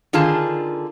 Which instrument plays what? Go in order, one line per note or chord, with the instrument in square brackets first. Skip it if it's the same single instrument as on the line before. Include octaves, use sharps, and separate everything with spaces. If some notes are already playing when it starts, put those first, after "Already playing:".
[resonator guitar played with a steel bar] D3 D#3 F4 G#4 A5